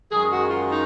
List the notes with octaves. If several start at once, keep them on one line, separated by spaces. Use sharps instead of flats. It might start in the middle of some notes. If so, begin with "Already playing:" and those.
F#2 D#3 G#3 G#4
F#4
F4
D#4